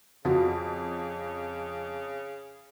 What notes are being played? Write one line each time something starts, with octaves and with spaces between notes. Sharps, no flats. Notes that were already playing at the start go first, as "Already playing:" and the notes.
F2 C#3 F4 F#4